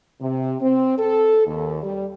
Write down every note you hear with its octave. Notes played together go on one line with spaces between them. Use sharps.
C3
C4
A4
D#2
G3